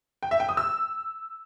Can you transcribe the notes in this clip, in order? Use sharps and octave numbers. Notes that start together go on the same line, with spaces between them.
G5
E5
G5
D#6
E6